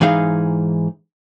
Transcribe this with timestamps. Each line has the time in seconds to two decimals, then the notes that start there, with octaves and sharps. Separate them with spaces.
0.01 G#2 E3 D#4 G#4 F5